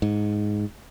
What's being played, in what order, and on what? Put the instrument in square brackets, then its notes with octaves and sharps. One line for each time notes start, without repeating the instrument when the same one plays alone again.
[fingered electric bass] G#2